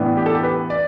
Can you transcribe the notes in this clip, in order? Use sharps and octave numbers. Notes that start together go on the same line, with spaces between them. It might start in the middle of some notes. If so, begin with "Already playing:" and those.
Already playing: A2 E3 B3 D4
G4
A4
G4
B4
D5